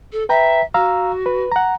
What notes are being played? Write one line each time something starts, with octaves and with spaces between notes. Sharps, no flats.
A4
B4 E5 G5 A#5
F#4 F5 A#5 E6
B4
F#5 A#5